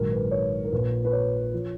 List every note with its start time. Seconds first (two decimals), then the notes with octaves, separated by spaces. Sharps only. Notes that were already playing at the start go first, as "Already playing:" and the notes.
Already playing: A#1 G#2 D#3 F#3 A#4
0.12 B4
0.31 C#5
0.64 A#4
0.72 A#1 A#2 F3 B4
1.05 B4
1.13 C#5
1.54 F3